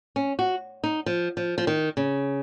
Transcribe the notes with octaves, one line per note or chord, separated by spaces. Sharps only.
C#4
F#4
D#4
F3
F3
F3
D#3
C#3